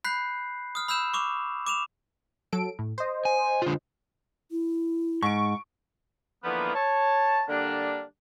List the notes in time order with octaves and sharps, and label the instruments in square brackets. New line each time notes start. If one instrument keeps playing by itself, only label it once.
[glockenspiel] B5 F#6 G6 B6 C7
D#6 F6
B5 E6 F6 G6 E7
C#6 D6 F7
D6 E7 F7
[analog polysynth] F#3 A4 D7
A2
C5 D#5
[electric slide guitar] G#5
D3 F4
[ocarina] E4
[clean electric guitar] G#2 [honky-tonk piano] C#6 D7
[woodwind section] D3 E3 F3 A#3 B3
C#5 A5
D3 G3 A#3 D4